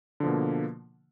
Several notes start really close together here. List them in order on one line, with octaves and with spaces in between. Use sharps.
D3 F3 B2 A#3